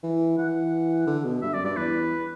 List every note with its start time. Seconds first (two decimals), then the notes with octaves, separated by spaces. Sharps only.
0.03 E3
0.38 E3 F#5
1.07 D3
1.24 B2
1.42 G2 E5
1.53 F#2 D5
1.64 G2 D5
1.76 E2 B4